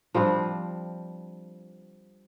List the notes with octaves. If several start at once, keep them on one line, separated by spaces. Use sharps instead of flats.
F3 G3 C4 D4